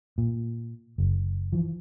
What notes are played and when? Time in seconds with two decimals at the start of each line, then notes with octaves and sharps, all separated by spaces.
0.18 A#2
0.98 F#1
1.52 E3 F3